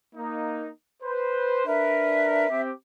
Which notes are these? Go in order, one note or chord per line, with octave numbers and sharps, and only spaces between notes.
A#3 D#4
B4 C5
D4 A#4 B4 E5
C4 G4